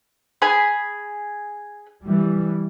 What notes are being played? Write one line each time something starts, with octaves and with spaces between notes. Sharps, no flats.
G#4 G#5 B5
E3 G3